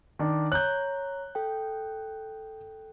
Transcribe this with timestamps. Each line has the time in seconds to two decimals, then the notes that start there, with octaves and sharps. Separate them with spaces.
0.19 D#3 D4
0.52 C#5 A#5 F#6 G6
1.35 A4 G5